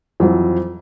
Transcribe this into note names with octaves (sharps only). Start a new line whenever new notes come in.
F2 E3 F#3 C4